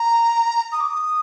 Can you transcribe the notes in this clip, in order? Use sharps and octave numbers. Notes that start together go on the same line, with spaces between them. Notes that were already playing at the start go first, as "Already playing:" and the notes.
Already playing: A#5
D#6
D6
D#6